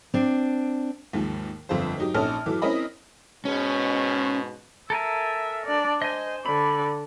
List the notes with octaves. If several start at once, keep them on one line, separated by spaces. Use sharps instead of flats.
C4 D4
D#2 G#2 F3
G1 F2 F4 C5
F#3 D#4 G4
A#1 C#4 D#4 A4 A5 F6
E3 F#3 A4 D6
C4 C#4 E4 A#4 D#5 B5
G#2 B2 C#4
A4 A#4 E5 G#5
D4 D5
C5 D#5 G#5
D3 D5 B5